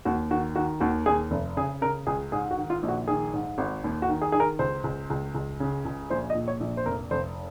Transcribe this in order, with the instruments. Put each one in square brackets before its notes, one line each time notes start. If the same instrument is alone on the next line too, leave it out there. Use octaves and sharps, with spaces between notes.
[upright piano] D#2 F#4
D#3 F#4
D#3 F#4
D#2 F#4
D#2 G#4
F1
C#3 G#4
C#3 A#4
C#2 G#4
G#2 G#4
F#4
D#3
F4
A#1
F#4
D#3 G#4
G#2
G#1
D#2
F#4
D#3
G#4
D#3 G#4
A#4
C#2 C5
C#2
C#2
C#2
C#3
C#2
A#1 C5
D#5
A#2
C#5
A#1
C5
F1 A#4
F1 C5